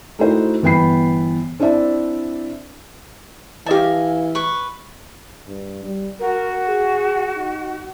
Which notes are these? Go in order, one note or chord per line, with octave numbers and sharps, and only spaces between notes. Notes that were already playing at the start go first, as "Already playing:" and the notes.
A3 D#4 E4 F#4 A#4 C5
G1 E3 B3 G5 B5 C7
C4 D4 E4 D5 E5 A5
E3 G4 D#5 F5 G#5 A5
B4 C#6
G2
G3
F#4 A#4
G#4
D#4